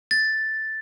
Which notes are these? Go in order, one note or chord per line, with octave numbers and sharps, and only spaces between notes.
A6